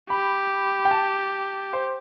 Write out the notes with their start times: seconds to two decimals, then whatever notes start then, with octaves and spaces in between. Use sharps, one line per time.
0.10 G4 B5
0.85 G5
0.91 A5
1.73 C5